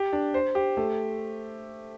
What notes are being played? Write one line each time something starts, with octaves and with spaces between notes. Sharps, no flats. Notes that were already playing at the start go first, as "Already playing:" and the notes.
Already playing: G4
D4
C5
G4
A3